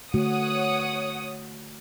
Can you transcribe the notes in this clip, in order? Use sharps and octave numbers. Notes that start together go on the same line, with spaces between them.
D3 A3 F#4 C#5 F#5 D#6